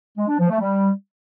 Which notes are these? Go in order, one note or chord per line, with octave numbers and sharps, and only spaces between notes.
G#3
D4
F3
A3
G3